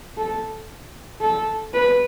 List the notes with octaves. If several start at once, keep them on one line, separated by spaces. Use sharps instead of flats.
A4
A4
B4